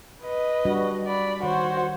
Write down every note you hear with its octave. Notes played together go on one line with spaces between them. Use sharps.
B4 D#5
G3 D4 F#4
D5 B5
D#3 F#4 C5 C#5